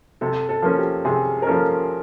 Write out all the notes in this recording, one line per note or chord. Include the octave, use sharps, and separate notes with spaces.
C3 A4
A4
F3 A#3 C#4
G4
C3 G#4
A#4
F3 A#3 C#4 A4